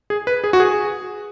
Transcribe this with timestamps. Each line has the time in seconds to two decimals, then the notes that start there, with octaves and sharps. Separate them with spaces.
0.10 G#4
0.27 B4
0.44 G#4
0.53 F#4
0.60 G#4